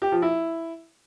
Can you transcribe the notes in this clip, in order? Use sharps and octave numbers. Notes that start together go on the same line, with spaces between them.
G4
F3
E4